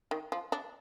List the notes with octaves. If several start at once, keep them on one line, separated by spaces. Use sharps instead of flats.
D#3
F3
D4